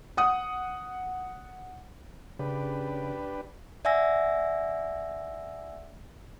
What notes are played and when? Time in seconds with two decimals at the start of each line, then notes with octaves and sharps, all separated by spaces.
0.17 F#5 D#6
2.39 C#3 D4 G4 B4
3.85 D5 E5 F#5 G#5 E6 A#6